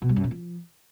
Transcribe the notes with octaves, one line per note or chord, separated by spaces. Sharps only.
B2
G3
F#2
A#2
F3